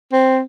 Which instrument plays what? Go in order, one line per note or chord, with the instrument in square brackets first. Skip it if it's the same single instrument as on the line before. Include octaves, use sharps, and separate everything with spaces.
[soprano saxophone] C4